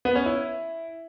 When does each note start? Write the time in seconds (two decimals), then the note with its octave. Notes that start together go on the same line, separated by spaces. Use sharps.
0.05 B3
0.15 C#4
0.26 E4